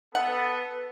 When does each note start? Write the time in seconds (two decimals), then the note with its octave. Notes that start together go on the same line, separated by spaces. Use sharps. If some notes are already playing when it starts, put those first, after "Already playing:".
0.15 B3 A4 B4 F#5